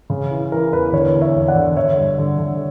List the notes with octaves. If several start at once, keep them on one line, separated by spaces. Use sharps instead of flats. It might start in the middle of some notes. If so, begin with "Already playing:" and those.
C#3
E3
E3 A#4
E2 B4
D3 A#4 C#5
E2
C#5 E5
E2
D5 F#5
D3
D3 C#5 E5
G2
D3
D3